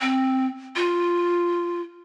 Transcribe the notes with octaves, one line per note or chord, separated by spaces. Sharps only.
C4
F4